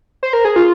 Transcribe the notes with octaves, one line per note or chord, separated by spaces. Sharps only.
C5
A#4
G#4
F4